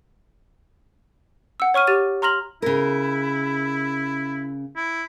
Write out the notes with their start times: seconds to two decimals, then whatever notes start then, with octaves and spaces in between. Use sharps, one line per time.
1.60 F#5 E6
1.74 C#5 C#6 F6 D#7
1.87 G4 A6 D#7
2.22 A#5 C6 F6 A#6 F7 F#7
2.62 C#3 E4 A#4
4.76 E4